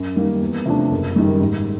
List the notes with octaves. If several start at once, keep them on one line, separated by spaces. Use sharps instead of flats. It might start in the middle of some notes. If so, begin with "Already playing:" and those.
Already playing: F#2
D#3 G3 A#3
E2
C3 F3 A3 D4
F#1
F#2 D#3 G3
G#2